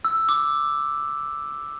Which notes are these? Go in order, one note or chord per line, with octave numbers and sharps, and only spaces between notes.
E6
D6